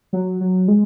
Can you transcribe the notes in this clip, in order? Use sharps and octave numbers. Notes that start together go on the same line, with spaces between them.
F#3
F#3
G#3